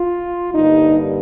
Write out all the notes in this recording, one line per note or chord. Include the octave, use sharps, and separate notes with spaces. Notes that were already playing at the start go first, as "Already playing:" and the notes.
Already playing: F4
G2 D3 G3 A#3 D#4